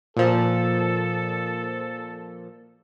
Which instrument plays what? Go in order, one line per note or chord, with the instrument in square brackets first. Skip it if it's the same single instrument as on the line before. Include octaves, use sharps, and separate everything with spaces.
[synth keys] A#2 F3 [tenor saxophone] A4